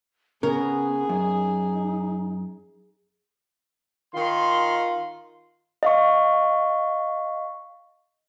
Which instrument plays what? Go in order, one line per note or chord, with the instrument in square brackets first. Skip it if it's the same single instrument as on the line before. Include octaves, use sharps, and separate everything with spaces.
[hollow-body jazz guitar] C#3 [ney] B3 [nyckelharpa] G#4 [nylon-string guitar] A#4
[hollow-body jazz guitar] F#2 [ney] D#4
[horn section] D#3 C6 [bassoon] F4
[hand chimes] D#5 F5 C#6